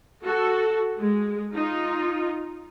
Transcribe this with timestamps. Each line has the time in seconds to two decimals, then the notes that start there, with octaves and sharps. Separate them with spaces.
0.23 F#4 A4
0.99 G#3
1.54 D#4 F4